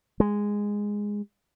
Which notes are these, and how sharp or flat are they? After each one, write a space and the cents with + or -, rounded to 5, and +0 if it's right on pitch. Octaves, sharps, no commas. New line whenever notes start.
G#3 -10